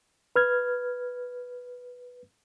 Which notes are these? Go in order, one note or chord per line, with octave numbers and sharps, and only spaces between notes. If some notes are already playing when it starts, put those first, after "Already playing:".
B4 F6 G#6